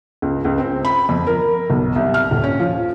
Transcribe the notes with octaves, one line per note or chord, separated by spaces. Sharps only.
C#2
C#2
C4
B5
F2
A#4
B1
C2
F6
D#1
C#4
F3